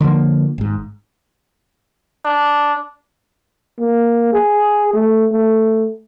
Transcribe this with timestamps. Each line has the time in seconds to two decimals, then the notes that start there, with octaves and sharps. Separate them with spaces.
0.01 D3 F3 A3 A#3
0.58 G#1 G#2
2.25 D4
3.79 A#3
4.33 G#4
4.93 A3
5.32 A3